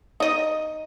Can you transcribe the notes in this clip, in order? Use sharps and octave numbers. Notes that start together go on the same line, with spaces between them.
D#4 D#5